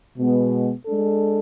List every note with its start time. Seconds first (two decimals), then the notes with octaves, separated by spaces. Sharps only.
0.17 B2 G#3 B3
0.85 G#3 D4 A4